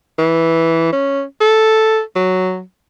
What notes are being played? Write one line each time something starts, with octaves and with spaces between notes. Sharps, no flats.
E3
C#4
A4
F#3